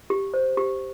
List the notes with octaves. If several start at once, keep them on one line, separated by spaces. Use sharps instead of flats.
G4
C5
G4